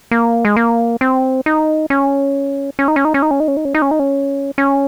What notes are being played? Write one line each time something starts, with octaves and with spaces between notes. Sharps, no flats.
A#3
G#3
A#3
C4
D#4
C#4
C#4
D#4
C#4
D#4
C#4
D#4
C#4
D#4
C#4
D#4
C#4
D#4
C#4
D#4
C#4
C#4